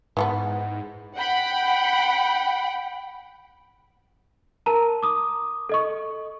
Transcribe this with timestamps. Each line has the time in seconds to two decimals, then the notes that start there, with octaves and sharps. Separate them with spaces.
0.17 G#2 E3 A3 B3
1.16 F#5 G5 B5
4.66 A#4 A5 A#5
5.03 D6 D#6
5.69 A4 D#5 C#6